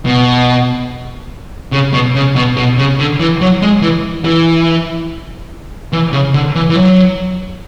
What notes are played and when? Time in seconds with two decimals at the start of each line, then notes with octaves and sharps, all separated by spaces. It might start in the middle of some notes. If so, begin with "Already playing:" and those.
0.05 B2
1.72 C#3
1.93 B2
2.15 C#3
2.36 B2
2.57 B2
2.78 C#3
2.99 D3
3.20 E3
3.41 F#3
3.62 G#3
3.82 E3
4.25 E3
5.93 E3
6.13 C#3
6.34 D3
6.55 E3
6.69 E3
6.76 F#3